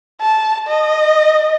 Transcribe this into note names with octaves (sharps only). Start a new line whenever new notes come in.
A5
D#5